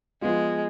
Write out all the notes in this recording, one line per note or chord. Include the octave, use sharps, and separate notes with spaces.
F3 G#3 B3 F4